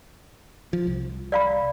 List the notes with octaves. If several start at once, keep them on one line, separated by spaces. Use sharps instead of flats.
F3
C2
D5 F5 B5